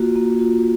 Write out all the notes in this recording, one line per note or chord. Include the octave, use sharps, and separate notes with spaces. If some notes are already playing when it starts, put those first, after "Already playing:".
Already playing: A#3 F4 F#4
A#3
F4